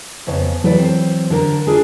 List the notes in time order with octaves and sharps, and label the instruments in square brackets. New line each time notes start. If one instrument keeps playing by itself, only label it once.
[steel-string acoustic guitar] F2 C#3 B3
[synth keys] E3 F#3 [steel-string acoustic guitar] A4 B4 D5
[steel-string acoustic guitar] C4
D3 D4 A#4
D4 F4 G#4